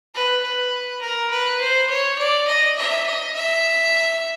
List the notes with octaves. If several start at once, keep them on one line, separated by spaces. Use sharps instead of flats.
B4
B4
A#4
B4
C5
C#5
D5
D#5
E5
D#5
E5